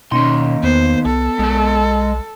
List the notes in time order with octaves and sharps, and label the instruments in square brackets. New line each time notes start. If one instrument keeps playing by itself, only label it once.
[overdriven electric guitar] D#2 C6 [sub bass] B2 [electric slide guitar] A#3 C#4 D#4
[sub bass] E2 [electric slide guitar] B3 [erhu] C5
[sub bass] C2 [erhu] A4
[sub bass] B1 [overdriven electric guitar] G#3 A5